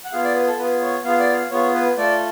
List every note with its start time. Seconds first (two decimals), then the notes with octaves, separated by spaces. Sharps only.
0.04 F#5
0.13 B3 F4 G#4 F5
0.24 D5
0.35 B4
0.47 A4
0.58 B3 F4 G#4 B4
0.81 C#5
1.05 B3 F4 G#4 F5
1.19 D5
1.31 F5
1.51 B3 F4 G#4 C#5
1.74 B4
1.97 A3 F4 A4 D5